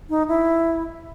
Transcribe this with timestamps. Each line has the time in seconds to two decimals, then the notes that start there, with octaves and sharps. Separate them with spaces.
0.09 D#4
0.28 E4